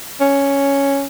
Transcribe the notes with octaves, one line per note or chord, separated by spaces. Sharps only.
C#4